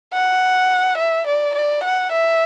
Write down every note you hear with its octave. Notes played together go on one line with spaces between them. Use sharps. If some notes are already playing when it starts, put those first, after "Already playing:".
F#5
E5
D5
D5
F#5
E5